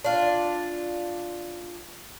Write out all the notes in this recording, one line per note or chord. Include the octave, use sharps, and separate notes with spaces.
D4 F4